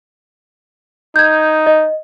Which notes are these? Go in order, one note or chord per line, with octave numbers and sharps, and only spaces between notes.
D#4 G6 G#6
D#5